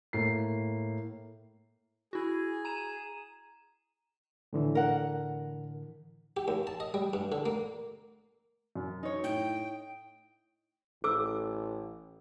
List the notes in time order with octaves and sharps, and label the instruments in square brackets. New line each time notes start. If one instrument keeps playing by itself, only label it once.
[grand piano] A2 A#3 C7
[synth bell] E4 F#4 [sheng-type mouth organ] G#4
[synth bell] A#5 D#7 E7
[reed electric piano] A2 D3 E3
[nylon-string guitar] A#4 F#5
[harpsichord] G4
D#2
A5
D#5
G3
G2
D3
A#3
[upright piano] F#2
[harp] D#4 C#5
[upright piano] A2 [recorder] G5
[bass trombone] A1 [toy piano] A4 D6 E6